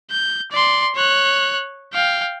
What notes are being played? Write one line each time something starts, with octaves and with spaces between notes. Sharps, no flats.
G6
D5 C6
C#5 F#6
F5 G5